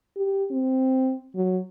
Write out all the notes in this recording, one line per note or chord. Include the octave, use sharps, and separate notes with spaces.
G4
C4
F#3